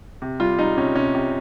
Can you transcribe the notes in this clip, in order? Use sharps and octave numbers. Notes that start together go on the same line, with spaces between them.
C3
G3 F4
G3 D#4
C3 C#4
C3 C#4
C3